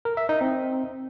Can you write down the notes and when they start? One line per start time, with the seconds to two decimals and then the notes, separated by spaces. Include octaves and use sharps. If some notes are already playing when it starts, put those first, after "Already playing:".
0.05 A#4
0.17 E5
0.29 D#4
0.41 C4